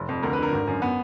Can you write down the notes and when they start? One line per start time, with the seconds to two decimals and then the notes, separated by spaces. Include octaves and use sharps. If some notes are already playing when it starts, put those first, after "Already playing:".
Already playing: F1
0.09 F2
0.23 D2 A#4
0.33 B4
0.38 D3 A#4
0.52 G#1
0.67 F#2
0.82 B3